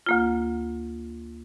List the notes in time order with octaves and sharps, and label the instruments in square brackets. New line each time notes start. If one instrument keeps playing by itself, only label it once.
[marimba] D2 A#3 F4